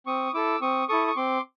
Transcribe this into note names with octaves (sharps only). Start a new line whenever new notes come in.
C4 C#6 D#6
E4 A4 D6 E6
C4 C#6 D#6
E4 A4 C#6 D#6
C#6
C4 C6 D6